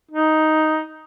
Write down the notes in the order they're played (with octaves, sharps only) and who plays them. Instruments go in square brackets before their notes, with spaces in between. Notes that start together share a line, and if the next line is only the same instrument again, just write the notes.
[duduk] D#4